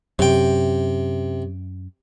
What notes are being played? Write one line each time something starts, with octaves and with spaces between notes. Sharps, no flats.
F#2 C3 G5